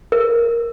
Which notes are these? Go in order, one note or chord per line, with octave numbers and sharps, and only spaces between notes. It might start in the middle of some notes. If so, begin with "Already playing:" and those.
A#4